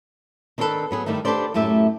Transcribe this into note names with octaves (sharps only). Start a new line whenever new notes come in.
D#3 C4 D4 G#4 A4 B4
F#3 B3 G#4
G2 D#3 G3 A3 D#4
D4 G4 A4 B4 C5 D5
F#2 A2 A3 G4 E5